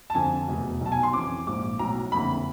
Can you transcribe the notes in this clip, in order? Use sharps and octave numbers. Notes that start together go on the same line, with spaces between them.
A5
F2 D3 F3 G#5
F1 E2 B2
B1 B2 F#3 A5
G#5
C6
F2 C#3 E3 D6
A#1 G#2 F3 D6
B1 A2 F#3 A#5
F#1 F2 D3 B5